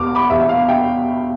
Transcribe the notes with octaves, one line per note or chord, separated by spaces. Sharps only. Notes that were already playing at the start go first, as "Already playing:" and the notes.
Already playing: E1 E2 B2 D6 F6
B5 D6
E1 E2 B2 E5
E5
F5
E5 G5